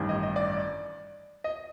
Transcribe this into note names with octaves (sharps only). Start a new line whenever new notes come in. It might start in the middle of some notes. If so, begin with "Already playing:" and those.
Already playing: A1 G2 D#3
D#5
D#5
D5
D#5